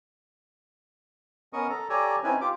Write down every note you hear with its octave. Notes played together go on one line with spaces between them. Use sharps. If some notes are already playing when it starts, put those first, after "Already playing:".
B3 C#4 A#4 D#5 C#6 D#6
A4 A#5
G4 A4 C#5 D5 G#5 A#5
C4 C#4 D#4 E4 B4 G#5
F4 G4 D6